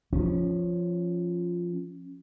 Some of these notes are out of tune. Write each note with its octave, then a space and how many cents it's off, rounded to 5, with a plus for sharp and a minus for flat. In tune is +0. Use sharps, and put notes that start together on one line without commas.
F3 +0 C#4 +0